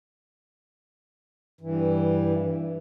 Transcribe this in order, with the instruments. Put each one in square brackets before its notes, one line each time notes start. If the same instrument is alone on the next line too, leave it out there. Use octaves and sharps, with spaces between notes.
[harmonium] G2 E3